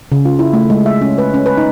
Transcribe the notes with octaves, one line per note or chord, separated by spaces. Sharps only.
C#3
F4
E4
A3
G#3
E5
C#4
B4
C#4
B4
D#4